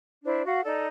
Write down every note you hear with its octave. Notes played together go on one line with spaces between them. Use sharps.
D4 E4 C5 D5
F#4 F5 F#5
D#4 A4 D5